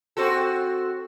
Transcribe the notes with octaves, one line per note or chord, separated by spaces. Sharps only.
C4 F#4 A4